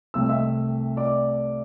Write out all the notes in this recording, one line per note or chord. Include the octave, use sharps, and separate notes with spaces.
C2 C3 A3 E6
E5 E6
D5 D6